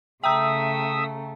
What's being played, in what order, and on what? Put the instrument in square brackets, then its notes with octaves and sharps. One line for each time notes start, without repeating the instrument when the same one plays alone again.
[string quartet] C#3 A3 [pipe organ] E5 D#6 E6 [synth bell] G5 A#5